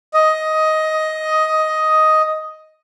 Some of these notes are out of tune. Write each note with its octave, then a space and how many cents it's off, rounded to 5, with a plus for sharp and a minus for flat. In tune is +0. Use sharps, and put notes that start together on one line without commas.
D#5 +10